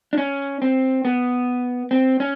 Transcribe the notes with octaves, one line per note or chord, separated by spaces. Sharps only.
D4
C#4
C4
B3
C4
C#4